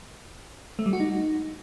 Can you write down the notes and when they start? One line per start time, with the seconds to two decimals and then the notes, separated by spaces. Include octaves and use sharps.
0.79 A3
0.86 G3
0.93 F#4
1.00 D#4